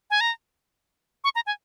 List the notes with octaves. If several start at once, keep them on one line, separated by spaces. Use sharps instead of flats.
G#5
A#5
C#6
A#5
G#5